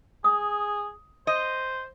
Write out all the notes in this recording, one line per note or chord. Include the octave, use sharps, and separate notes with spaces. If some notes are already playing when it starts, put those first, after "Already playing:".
G#4 D#6
C5 D#5